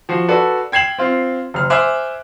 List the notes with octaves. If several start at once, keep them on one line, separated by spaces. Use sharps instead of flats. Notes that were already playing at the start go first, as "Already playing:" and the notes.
F3 F#4
F#4 A4 B4 D5
G5 G#6 C7 E7 F#7
C4 F4
F#1 F6
C5 E5 G#5 D6 F6 F#6